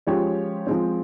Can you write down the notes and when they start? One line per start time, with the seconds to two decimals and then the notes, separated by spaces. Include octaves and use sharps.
0.07 F3 G#3 C#4 G4 C#5
0.67 F3 G#3 C4